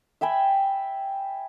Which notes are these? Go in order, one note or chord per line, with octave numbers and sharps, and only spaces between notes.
E5 G5 G#5 B5